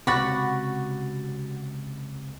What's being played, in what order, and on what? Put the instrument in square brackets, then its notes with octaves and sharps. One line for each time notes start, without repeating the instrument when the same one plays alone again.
[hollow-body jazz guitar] C#2 C3 [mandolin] F#4 [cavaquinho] F#5 B5 C#6 [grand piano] D6 A6